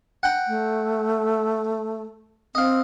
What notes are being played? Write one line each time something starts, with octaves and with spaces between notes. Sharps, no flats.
F#5 G5 A#5
A3
C4 D#5 F5